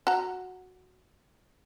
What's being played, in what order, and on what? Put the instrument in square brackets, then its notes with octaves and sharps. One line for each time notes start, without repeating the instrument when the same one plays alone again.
[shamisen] F#4 A#5